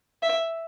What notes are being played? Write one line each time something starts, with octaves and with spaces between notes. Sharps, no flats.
E5